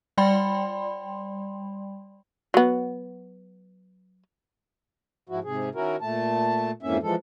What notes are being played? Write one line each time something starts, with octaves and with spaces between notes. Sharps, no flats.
G3 D5 G5 B5 C6
F#3 B3
G#2 F3 E4 F#4
G#2 C3 G#4
D#3 C#4 E4 F#4 A#4
A#2 A3 A5
F2 G#2 E3 A#3 C#4 E5
E3 F3 G#3 A4